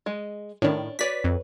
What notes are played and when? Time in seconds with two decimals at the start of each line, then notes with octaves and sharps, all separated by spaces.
0.06 G#3 D#5
0.62 A2 D#3 C#4 D4 C#5
0.99 F#4 B4 C#5 D5 B6
1.24 F2